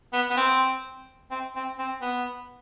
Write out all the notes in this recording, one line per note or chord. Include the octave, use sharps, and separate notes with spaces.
B3
B3
C4
C4
C4
C4
B3